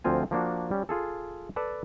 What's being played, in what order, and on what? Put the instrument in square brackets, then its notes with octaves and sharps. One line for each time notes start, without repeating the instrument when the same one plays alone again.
[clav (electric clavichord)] D2 F3 C4 F4 G#5
F3 A#3 D4 F#4
G3 C#4
F4 G#4 A4
A4 B4 D5 A5